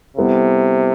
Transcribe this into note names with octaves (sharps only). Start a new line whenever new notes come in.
C3 G3 B3 E4 A4